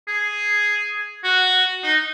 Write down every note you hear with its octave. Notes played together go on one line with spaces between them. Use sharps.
G#4
F#4
D#4